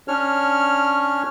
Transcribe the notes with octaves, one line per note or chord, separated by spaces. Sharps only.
C#4 D4 C#5 F6